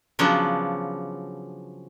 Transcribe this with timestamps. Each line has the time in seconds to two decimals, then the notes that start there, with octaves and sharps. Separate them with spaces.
0.19 C#3 F3 F#3 B3 D4